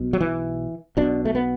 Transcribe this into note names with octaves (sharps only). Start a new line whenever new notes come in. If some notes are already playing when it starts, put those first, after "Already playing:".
Already playing: B1 B2
F#3
E3
B1 B2 D4
A3
B3